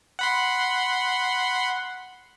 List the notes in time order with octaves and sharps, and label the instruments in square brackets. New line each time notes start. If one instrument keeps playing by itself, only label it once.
[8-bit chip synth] F#5 B5 C6